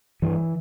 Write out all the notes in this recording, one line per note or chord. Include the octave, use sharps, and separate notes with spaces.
G2 E3